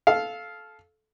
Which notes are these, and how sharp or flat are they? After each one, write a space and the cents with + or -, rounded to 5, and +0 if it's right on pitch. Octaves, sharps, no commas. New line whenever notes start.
A4 -20 F5 +0